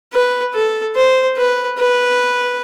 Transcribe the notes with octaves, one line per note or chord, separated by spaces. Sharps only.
B4
A4
C5
B4
B4